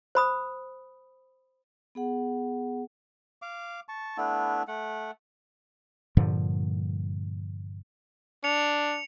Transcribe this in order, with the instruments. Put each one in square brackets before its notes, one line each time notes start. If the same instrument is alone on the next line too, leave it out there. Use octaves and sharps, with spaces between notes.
[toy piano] C5 B5 D#6
[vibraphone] B3 G#4 F#5
[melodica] F5 D6
A5 C#6
A3 B3 D4 E4
A3 F#5
[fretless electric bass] G2 A#2 D3 F3
[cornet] D4 [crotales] C#7 F7